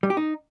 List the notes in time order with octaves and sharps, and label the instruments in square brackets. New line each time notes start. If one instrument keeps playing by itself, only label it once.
[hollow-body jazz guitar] G3
G4
D#4